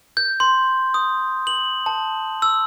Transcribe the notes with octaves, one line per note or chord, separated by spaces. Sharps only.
G6
C6
D#6
F#7
A5
E6